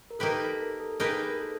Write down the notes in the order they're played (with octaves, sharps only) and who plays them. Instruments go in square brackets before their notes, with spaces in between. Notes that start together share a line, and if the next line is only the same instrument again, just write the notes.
[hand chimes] A#4
[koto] A#3 D#4 G4 B4 [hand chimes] A4
[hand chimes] A4
A#4
A#4
A4
[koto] A#3 D#4 G4 B4 [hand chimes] G#4
[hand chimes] A#4
A4